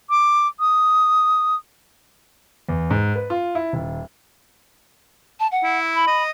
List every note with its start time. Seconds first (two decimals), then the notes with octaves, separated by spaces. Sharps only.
0.10 D6
0.60 D#6
2.69 E2
2.90 G#2
3.16 B4
3.30 F4
3.55 E4
3.73 D#1
5.39 A5
5.51 F#5
5.64 E4
5.94 B5
6.08 D#5